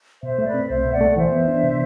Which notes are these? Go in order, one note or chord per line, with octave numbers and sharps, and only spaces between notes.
B2 C5 E5
A3
B4 D5
C4
C2 C5 E5
B2
D5 F#5
A3
E3 C5 E5
B3
D4
C3